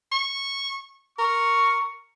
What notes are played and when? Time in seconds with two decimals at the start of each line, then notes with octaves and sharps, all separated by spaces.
0.12 C#6
1.18 A#4 C#6